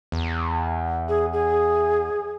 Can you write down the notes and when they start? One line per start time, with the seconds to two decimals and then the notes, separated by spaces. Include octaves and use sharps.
0.12 E2
1.09 G#4
1.33 G#4